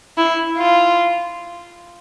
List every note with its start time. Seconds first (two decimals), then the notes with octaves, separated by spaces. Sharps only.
0.18 E4
0.57 F4